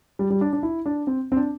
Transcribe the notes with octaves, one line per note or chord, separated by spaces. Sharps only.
G3
G3
D4
D4
E4
D4
C4
C4
D4